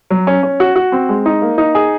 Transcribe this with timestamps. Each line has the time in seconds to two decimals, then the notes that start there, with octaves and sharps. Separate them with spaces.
0.10 F#3
0.27 C#4
0.43 C#4
0.60 F#4
0.76 F#4
0.92 C4
1.09 G#3
1.26 D#4
1.42 A#3
1.58 D#4
1.75 G#4